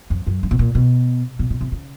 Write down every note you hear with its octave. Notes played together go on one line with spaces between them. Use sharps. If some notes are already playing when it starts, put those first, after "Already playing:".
F2
F#2
G2
B2
A#2
B2
B2
B2
C3
C#3